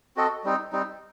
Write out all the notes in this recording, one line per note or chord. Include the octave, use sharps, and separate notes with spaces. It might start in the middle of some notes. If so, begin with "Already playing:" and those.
C4 F#4 A4 D#5
G3 C4 D#4
G3 C4 D#4